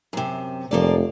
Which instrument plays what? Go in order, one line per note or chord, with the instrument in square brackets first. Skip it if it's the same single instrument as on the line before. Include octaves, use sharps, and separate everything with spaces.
[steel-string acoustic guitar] F#2 C3
[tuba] F1 [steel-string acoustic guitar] F3 A#3 D5